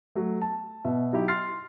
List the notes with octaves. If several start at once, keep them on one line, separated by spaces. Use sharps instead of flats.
F#3 A3
A5
B2 E5
F#3 D#4 E4 G4
C6 F6 A6 C7